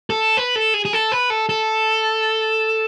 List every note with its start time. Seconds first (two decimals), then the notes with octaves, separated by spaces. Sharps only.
0.10 A4
0.37 B4
0.56 A4
0.74 G#4
0.85 G#4
0.93 A4
1.12 B4
1.30 A4
1.49 A4